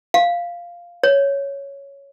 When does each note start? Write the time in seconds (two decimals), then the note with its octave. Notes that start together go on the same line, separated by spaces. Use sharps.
0.14 F5
1.03 C#5